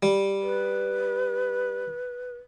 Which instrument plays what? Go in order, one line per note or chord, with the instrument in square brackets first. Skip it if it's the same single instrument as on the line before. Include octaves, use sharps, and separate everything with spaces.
[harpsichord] G3
[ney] B4